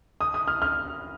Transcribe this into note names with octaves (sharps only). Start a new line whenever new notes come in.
D#6
D#6
F6
F6